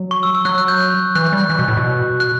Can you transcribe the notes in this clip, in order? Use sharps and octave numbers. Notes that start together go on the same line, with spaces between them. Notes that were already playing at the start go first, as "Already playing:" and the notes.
Already playing: F#3
C#6
E6
E6
F#3 F#6
F#6
G6
E3 F#6
F#6
G3
F#6
E3
B2
A2
B2
F#6